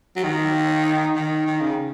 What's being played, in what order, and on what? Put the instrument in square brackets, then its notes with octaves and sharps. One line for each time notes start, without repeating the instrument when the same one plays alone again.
[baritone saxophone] F#3
D#3
D#3
D#3
C#3